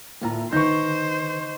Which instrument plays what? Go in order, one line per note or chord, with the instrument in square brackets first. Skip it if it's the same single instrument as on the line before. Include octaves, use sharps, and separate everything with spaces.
[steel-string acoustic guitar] D2 A2 [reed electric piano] A#3 F4 A#5
[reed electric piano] D3 D#3 B4 [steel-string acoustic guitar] D#4 [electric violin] C5 [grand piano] C#6 G6